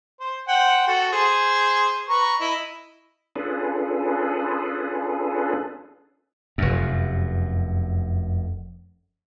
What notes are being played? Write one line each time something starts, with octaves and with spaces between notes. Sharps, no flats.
C5
C5 F#5 G5
F#4 A4 F#5
G#4 C5
B4 A#5 C#6
E4 D#5
C#4 D4 F4 G#4 A4 B4
F1 F#2